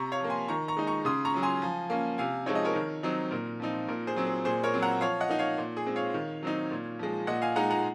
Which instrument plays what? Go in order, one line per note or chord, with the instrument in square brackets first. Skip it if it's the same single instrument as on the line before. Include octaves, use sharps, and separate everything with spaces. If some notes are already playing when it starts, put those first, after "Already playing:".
Already playing: [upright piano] C3 A#5 C#6
C#5 F5
F3 A#3
G#5 C6
D#3 A#5 C#6
A#5 C#6
G#3 D#4
A#5 C#6
C#3 C6 D#6
A#5 C#6
F#3 C#4
G#5 C6
F3
A#3 C#4
C3 F5 G#5
F3 G#3 C4 D#4 C#5
D#5
A#4 C#5
D#3
F#3 C4 D#4
A#2 A#4
F3 C4 D#4
A#2 A#4
G#4 C5
F#3 C4
G#4
A#2 G#4 C5
A#4 C#5
F#3 C4
F#5 A#5
F3 C#5 F5
D#5 F#5
A#3 D#4
C#5 F5
A#2
G#4
G#3 C4
C#5 F5
D#3
F#3 C4 D#4
A#2
F3 G#3
A#2 D#5 F#5
F5 G#5
G#3 D#4 F#5 A#5
F#5 A#5